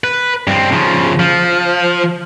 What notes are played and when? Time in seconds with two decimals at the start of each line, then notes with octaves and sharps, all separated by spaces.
0.04 B4
0.47 G2 C4
0.72 C#3 F3
1.19 F3